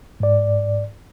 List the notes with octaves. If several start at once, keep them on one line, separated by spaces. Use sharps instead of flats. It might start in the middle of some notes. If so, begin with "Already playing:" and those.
G#2 D5